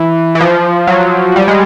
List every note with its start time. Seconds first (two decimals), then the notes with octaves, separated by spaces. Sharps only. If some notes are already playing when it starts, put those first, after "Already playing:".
Already playing: E3
0.35 E3
0.41 F3
0.87 F#3
1.36 G3
1.48 G#3